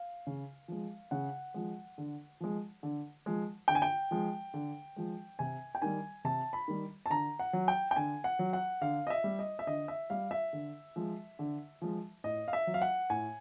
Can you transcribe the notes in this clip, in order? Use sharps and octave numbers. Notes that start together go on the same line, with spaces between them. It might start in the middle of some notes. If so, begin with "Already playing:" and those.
Already playing: F5
C#3
F3 G#3
C#3 F#5
F3 G#3
D3
F3 G#3
D3
F3 G#3
D3 G5
G#5
G5
F3 G#3
D3
F3 G#3
C3 G#5
G5
D#3 G3 G#5
C3 A5
B5
D#3 G3
A5
D3 A#5
F#5
F#3
G5
G5
D3 G#5
F#5
F#3
F#5
D3 F5
D#5
E5
G3
D#5
E5
D3 D#5
E5
G3 F5
E5
D3
F3 G#3
D3
F3 G#3
A2 D#5
F5
E5
F#3
F5
F#5
A2 G#5